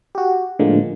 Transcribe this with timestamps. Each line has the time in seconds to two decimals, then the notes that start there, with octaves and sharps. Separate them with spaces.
0.15 F#4 G4
0.59 A2 D3 F3 G#3 A#3